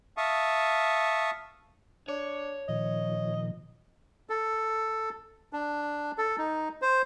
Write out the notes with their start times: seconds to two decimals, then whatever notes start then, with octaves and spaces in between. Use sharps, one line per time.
0.17 E5 F5 A5 C#6 D#6
2.08 D4 C#5
2.68 A#2 D#3 F3 D#5
4.29 A4
5.53 D4
6.18 A4
6.38 D#4
6.82 C5